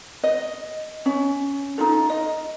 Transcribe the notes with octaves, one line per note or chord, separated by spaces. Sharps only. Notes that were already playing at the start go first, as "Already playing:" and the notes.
D#5
C#4
D#4 F4 A4
D#5